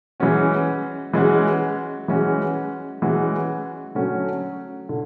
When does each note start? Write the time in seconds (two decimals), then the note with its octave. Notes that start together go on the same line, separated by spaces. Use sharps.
0.20 E3 G#3 C#4 F#4
1.13 E3 G#3 C#4 F#4
2.08 E3 G#3 C#4 F#4
3.02 E3 G#3 C#4 F#4
3.95 D3 F#3 A3 C#4 F#4
4.89 D3